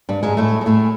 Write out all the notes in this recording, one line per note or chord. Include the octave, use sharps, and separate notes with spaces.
G2 G3
G#2 G#3
A2 A3
G#3
A2 A3